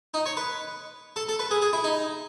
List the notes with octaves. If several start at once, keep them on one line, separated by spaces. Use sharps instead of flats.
D#4
C#5
B4
A4
A4
B4
G#4
G#4
E4
D#4